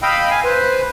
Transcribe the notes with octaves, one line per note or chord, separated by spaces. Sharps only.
D#5 F5 G5 B5 E6
F5 G#5
B4 C5